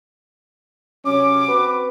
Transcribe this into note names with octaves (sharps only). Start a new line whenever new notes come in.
C3 F#3 C#4 D6
C4 F#4 B4